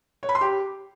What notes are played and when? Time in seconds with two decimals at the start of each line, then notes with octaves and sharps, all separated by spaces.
0.23 C#5
0.29 B5
0.35 C6
0.41 G4